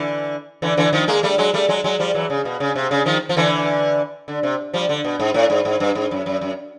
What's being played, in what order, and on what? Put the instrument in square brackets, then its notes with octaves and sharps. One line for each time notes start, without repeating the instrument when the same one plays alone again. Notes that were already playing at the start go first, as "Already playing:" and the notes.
Already playing: [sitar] D3 E3
D3 E3
D3 E3
D#3 F3
G#3 A#3
G3 A3
F#3 G#3
G3 A3
F#3 G#3
F#3 G#3
F3 G3
E3 F#3
C#3
B2
C#3
C3
C#3
D#3 F3
F3
D3 E3
D3
C3
F3 G3
D3
B2
G#2
A2
G#2
G#2
G2
G#2
F#2
F#2
F#2